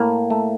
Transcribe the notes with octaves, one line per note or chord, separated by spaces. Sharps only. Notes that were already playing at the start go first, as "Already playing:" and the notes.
Already playing: A2 A#3
A3